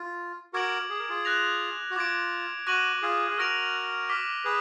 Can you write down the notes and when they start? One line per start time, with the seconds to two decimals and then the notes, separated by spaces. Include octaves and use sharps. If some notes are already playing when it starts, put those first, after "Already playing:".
Already playing: F4
0.53 F#4 A#4 D6 G#6 D7 F#7
0.90 G#4
0.99 A#4
1.09 F4 G#4
1.25 F#6 A#6 F7
1.91 F#4
1.96 F4 D6 G#6 D7
2.67 F#4 D6 F#6 A#6 D#7 F#7
3.02 F4 G#4
3.29 G#4
3.37 F#4 A#4 F6 A#6 D7 F7
4.09 D6 F6 B6
4.45 G#4 B4